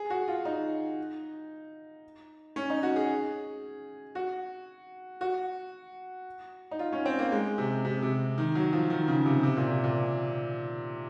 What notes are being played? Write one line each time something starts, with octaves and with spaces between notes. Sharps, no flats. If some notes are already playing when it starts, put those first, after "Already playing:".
Already playing: G#4
F#4
F4
D#4
C#4
D#4
F#4
G#4
F#4
F#4
D#4
F4
C#4
C4
A#3
G#3
C3
C3
C3
D#3
F#3
F3
D#3
C#3
C3
C3
A#2
C3
A#2